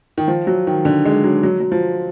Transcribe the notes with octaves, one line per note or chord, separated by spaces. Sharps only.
D#3
F3
F#3
D#3
D3
G#3
F#3
F#3
F#3
F3